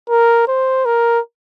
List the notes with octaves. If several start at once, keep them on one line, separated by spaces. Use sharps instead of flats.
A#4
C5
A#4